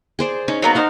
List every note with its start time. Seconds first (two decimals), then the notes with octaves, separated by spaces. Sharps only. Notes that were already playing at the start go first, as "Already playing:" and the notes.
0.19 G#4 C5 D5
0.48 C#4 D#4
0.62 F#3 A#3 B3 A#4
0.75 D#4 C5 F5 F#5